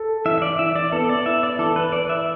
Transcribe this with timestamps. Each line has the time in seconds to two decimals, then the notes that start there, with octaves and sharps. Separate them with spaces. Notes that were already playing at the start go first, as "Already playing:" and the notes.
Already playing: A4
0.25 E3 E5
0.38 E5
0.42 D5
0.59 E3 E5
0.76 D5
0.92 B3 A4
1.09 D5
1.26 E4 E5
1.43 D5
1.59 E3 A4
1.76 B4
1.92 B4 D5
2.09 E5